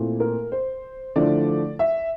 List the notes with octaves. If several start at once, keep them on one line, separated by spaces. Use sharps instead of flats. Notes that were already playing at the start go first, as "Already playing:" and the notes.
Already playing: A#2 A3 C4 E4
A#4
C5
D3 F3 A3 E4 D5
E5